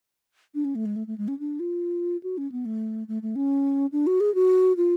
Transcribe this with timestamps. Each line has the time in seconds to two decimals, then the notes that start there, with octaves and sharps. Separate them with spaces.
0.55 D4
0.65 C#4
0.75 A3
0.86 G#3
0.96 A3
1.07 A3
1.18 G#3
1.28 C#4
1.39 D4
1.60 F4
2.23 F#4
2.38 C#4
2.52 B3
2.65 A3
3.08 A3
3.22 A3
3.36 C#4
3.92 D4
4.07 F#4
4.20 G#4
4.35 F#4
4.77 F4